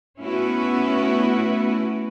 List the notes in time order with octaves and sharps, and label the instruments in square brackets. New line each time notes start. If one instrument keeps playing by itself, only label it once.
[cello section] A3 B3 C#4 E4 F#4 B4